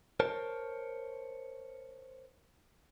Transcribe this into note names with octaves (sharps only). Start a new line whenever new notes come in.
A#4 C5 C#5 A5